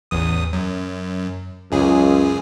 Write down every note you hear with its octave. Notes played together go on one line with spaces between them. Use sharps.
A1 E2 D#6
F#2
C#2 F#2 G#4